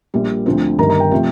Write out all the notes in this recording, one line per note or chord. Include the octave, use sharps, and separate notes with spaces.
A#1 A#2 G3
D2 D3 F3 C4
G1 G2 D#3 A#3 A#5
A#5
G5
C3 F3 A3